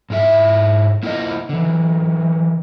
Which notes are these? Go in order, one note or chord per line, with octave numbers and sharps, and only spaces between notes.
G#2 G#3 E4 E5
A#3 E4 F4 C5 D#5
D3 E3